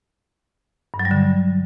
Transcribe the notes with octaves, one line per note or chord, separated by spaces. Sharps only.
G2
F#3
G3
D3